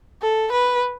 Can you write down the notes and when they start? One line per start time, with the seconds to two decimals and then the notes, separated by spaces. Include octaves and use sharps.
0.22 A4
0.52 B4